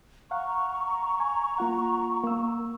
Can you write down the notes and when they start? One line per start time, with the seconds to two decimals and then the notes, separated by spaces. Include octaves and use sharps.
0.31 F5 F#5 A#5 C#6
1.20 G#5
1.58 A#3 F4 F#5
2.24 A#3 E6